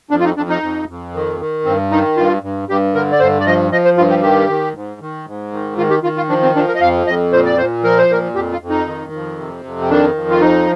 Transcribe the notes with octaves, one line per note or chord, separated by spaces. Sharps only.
F2 D4
F4
D#4
F2 D4
D#4
F2
F2
D#3
D#3
G2 C4
D#3 D#4
G2 F4
G2
G2 G4
D3 A#4
D5
G2 C5
D5
F3 D#5
F3 D#5
C5
G2 F4
G4
D#3 G4
D#3
G#2
D#3
G#2
D#3
D#3 F4
G4
D#3 F4
F4
F3 D4
C4
F3 D4
A#4
D#5
F2 F5
F2 D#5
A#2 C5
D5
A#2 C5
F3 A#4
C5
A#2 A#4
F2 G4
F4
F2
D#4
D#3
F2
C3
F2
C4
D#3 D4
F2
F4
F3 D#4